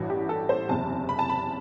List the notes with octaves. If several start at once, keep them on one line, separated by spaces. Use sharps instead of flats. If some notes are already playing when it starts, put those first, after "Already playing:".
Already playing: A1 G2 E3 F#4
G4
A4
C5
F#1 E2 C3 A5
B5
A5
B5